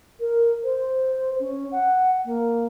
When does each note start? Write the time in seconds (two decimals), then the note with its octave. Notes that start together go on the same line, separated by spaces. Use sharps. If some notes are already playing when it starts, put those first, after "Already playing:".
0.20 A#4
0.64 C5
1.40 C#4
1.72 F#5
2.25 A#3